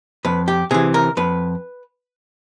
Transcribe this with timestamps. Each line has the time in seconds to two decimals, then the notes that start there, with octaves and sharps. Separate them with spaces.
0.25 F2 B4
0.48 G4
0.71 C3 E3 G#4
0.94 A#4
1.17 F2 B4